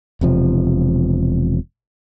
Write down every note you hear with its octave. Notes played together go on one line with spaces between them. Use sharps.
E1 C3 F3